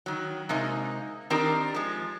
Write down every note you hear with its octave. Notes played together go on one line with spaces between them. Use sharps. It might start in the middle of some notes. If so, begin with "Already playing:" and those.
D#3 F#3
C3 G#3 A#3 D#4
D#3 C4 D4 D#4 G4 A#4
F3 G#3